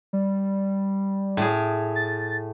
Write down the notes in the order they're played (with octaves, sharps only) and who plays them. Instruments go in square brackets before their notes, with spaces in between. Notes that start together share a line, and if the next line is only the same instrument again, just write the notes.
[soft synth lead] G3
[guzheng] A2 G#4
[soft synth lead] A6